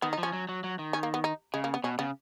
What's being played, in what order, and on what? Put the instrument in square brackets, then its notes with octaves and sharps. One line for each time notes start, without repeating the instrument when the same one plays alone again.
[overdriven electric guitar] D#3 [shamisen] B3
[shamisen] D#4
[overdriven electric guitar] F3 [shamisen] C#4
[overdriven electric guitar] F#3
F#3
F#3
D#3
[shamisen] C#4
A#3
B3
D#4
[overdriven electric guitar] C#3 [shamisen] G#3
[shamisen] A#3
B3
[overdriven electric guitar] B2 [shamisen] C#4
[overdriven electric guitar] C#3 [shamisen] B3